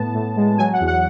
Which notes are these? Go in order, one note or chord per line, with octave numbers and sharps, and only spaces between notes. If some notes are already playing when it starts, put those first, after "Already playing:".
Already playing: A2 B3 A5
A2
G#3
F#3 G#5
F#5
E2
F#5